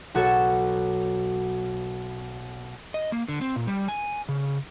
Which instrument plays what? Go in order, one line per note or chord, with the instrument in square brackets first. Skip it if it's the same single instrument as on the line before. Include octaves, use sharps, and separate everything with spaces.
[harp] B1 F#4 A4 C#5 E7
[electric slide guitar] D#5
A#3
D3
C4
A#2
G3
G#5
C#3